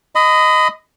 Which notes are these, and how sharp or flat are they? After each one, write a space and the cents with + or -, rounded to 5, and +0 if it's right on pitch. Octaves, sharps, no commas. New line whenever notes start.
D#5 +0 B5 +35